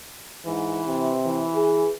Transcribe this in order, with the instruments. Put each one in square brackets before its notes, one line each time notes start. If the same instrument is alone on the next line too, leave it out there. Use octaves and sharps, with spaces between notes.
[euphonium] G#2 [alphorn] E3
[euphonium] C3
[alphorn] E3
[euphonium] G#4